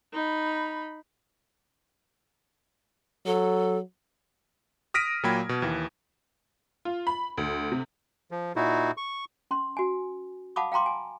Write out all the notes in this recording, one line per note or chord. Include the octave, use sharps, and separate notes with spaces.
D#4 B5
F#3 A4
D#6 F6 A#6 B6 D7 D#7
A#2 F#3 A#3 G5 B5 G#6
B2
D#2 E3
F4
B5
D2
C3
F3
A#2 D#4 E4 F#4
C#6
C#4 C6
F#4 G#5
F5 F#5 A5 B5 D6 D#6
F5 G5 A#5 C6 D6
G#5